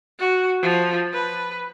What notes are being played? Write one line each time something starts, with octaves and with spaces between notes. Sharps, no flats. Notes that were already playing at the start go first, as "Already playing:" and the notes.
F#4
F3
B4